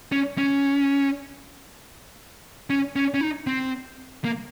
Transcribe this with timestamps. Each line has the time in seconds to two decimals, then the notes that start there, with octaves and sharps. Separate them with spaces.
0.12 C#4
0.38 C#4
2.70 C#4
2.96 C#4
3.14 C#4
3.21 D#4
3.47 C4
4.24 A#3